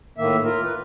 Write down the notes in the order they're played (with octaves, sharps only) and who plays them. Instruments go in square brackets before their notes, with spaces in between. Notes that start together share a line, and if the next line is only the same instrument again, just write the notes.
[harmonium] A2 D#3 A#3 E5
F4 A#4
B4